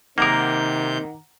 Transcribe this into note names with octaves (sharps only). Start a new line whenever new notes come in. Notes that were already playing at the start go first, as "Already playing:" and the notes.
C3 D#3 A#3 A#4 F#5 A#5 D6 G6